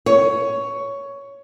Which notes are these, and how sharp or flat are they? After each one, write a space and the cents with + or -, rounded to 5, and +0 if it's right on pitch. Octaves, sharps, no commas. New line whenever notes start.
C#5 +10